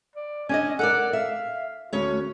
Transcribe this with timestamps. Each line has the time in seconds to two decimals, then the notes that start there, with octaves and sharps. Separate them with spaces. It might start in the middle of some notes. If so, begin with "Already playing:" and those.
0.15 D5
0.49 C#4 D4 D#5 G#5
0.79 A4 A#4 D5 F#5
1.13 E5 F5
1.93 D2 C#4 F#4 C#5